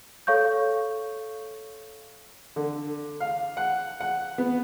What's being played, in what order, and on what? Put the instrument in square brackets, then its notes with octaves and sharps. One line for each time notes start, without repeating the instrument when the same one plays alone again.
[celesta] A4 C#5 F5 C#6 G6
[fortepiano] D3
F5
F#5
F#5
B3